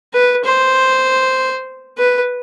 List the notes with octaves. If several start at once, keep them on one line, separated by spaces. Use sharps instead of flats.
B4
C5
B4